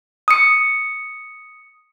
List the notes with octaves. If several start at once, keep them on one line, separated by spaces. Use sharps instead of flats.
D#6 C#7